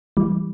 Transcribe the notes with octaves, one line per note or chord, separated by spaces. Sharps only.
E3 G3